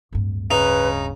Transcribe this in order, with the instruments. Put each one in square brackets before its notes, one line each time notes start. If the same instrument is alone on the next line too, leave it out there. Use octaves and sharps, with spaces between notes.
[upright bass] D1 G2
[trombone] C#3 [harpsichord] D#4 [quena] B4